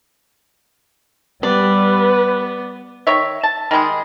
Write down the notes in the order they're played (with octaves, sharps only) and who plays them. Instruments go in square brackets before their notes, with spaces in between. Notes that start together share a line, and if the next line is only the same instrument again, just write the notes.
[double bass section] G3 [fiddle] B3 [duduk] B4 [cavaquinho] D5
[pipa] D#3 C#5 E5
A5
D#3 G3 G#3 G#4